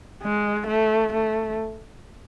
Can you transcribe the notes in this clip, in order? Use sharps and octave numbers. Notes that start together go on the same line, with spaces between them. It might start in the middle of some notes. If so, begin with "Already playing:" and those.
G#3
A3
A3